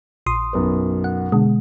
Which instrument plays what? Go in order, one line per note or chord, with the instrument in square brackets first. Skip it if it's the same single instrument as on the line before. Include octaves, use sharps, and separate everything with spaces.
[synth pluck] A#1 C6 D#6
[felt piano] B1 F#2 B4
[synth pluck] F#5
B2 D3 G#3